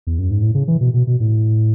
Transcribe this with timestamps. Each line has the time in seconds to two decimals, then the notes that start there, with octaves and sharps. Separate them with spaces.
0.07 E2
0.19 F#2
0.31 G#2
0.42 A2
0.55 C#3
0.68 E3
0.81 B2
0.94 B2
1.07 B2
1.20 A2